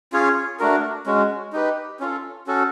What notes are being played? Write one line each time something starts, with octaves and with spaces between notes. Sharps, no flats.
C#4 F4 G#4 C#5
A3 D4 F#4 A#4
G#3 C#4 F#4
D#4 G4 B4
C#4 F4 A4
C#4 F#4 A4